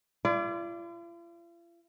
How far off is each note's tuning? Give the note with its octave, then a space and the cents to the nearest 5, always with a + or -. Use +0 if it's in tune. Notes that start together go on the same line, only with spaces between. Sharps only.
F4 -45 D5 +0